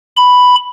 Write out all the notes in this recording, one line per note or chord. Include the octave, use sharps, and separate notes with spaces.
B5